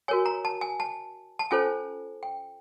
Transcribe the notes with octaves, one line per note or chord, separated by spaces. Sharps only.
F#4 A#4 C#5 G#5
A#5
A5
G#5
A5
A5
C#4 F4 A4 C5 G#5
G5